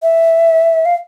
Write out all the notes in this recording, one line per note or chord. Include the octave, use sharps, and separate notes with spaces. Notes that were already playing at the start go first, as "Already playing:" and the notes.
E5
F5